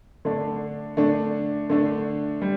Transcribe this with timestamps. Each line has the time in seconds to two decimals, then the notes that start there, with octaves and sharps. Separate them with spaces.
0.25 D3 A3 D4
0.97 D3 A3 D4
1.70 D3 A3 D4
2.42 G3